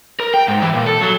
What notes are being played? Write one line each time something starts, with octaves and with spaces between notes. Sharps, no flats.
A#4
G5
G#2
E3
A#2
A4
F#3